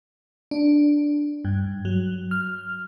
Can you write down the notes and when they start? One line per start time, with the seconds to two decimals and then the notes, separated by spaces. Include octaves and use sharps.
0.51 D4
1.45 G2
1.85 F#3
2.31 F6